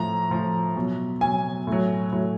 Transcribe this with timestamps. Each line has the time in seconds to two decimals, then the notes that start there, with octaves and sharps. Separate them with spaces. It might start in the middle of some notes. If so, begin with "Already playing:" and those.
Already playing: A2 F3 A#5
0.30 A2 F3
0.76 B2 F#3
1.21 B2 F#3 G#5
1.67 A2
1.72 F#3
2.13 A2 F#3